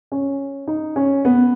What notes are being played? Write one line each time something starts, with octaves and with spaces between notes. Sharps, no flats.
C#4
D#4
C#4
B3